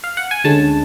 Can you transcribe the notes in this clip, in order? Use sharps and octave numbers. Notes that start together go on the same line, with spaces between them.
F5
F#5
G#5
D2 D3 G#3 C#4 A5